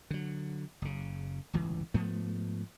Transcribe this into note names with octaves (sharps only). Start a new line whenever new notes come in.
D3 F#3
F#1 C#3
D1 G1 C#2 E3
G#2 F3 A3 B3